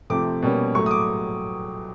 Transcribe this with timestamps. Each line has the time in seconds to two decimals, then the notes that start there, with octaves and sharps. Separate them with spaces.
0.10 C3 F3 A3 C4 D6
0.42 B2 G3 A#3 C#4
0.75 A2 F#3 A3 C#6
0.86 D#6
0.91 D6